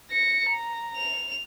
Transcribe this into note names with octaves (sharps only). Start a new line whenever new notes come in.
A#6 C#7
A#5
F7